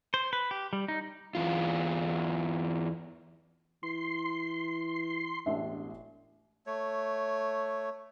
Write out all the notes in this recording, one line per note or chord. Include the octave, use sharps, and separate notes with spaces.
C5
B4
G4
G3
D#4
E2 F4
E3 C6
E1 A1 D4 E5
A3 C#5